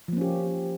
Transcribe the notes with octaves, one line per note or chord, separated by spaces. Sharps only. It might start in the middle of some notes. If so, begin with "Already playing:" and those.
F3 A#3 C#4 G4